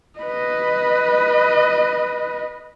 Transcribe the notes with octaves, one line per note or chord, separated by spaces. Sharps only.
B4 D#5